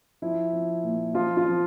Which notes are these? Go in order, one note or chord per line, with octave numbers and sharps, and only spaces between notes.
F3 E4
F3
A#2
F3 F4
F4
F3